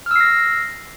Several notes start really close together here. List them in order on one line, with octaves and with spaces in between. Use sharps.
F6 E6 C7 A#6